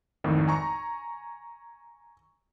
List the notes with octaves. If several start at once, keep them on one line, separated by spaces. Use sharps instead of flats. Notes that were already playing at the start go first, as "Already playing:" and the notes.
G#1 F2 A2 D#3
G#5 A#5 C#6